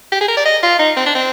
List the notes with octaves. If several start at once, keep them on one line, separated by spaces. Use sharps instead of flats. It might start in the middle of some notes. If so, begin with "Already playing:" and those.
G4
G#4
A#4
D5
D#5
F4
D#4
C4
D4
C4